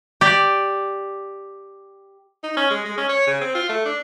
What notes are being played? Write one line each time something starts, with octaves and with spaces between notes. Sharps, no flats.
G4 D5
D#4
C#4
G#3
G#3
C#4
C#5
C#3
C4
F4
A3
D4